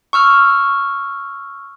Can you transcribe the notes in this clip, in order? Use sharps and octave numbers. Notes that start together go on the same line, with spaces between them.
C#6 E6 F6